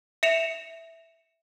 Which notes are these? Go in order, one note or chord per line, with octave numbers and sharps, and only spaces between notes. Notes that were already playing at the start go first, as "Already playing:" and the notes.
E5 C#7 E7 F7